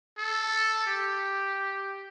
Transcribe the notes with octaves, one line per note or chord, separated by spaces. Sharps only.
A4
G4